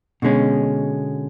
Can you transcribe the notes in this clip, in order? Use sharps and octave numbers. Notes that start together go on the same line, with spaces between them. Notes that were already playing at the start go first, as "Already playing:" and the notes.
B2 D3 G#3 C#4